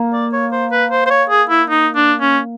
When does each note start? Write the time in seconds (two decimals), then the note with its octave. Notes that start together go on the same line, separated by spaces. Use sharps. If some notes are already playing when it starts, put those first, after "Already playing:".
Already playing: A#3
0.13 D5
0.33 C#5
0.52 C5
0.71 B4
0.91 C5
1.06 C5
1.10 C#5
1.29 G#4
1.50 E4
1.69 D#4
1.95 D4
2.21 C#4